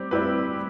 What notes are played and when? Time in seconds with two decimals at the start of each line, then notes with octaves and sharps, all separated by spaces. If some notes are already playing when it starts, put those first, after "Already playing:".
Already playing: G3 C4 G4
0.11 G3 C4 E4 G4 B4